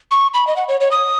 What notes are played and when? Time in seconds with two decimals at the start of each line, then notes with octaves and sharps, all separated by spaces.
0.11 C#6
0.34 B5
0.47 D#5
0.56 F#5
0.68 C#5
0.81 C#5
0.91 D#6